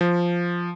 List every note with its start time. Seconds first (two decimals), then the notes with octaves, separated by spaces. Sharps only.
0.01 F3